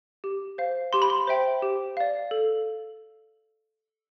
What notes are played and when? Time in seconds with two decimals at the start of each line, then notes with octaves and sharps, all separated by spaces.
0.24 G4
0.58 C5 F5
0.93 G4 C6
1.02 B5
1.10 C6
1.27 C5 E5 G5
1.62 G4
1.97 D5 F5
2.31 A4